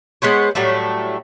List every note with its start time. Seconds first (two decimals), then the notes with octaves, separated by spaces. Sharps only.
0.22 G#3 B3 C5 C#5
0.55 A2 F#3 G3 A3